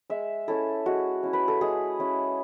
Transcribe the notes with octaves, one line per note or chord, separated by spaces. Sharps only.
G#3 E5
C#4 E4 A4
G#3 F#4
C#4 E4
B4
A4
G#3 G#4
C#4 E4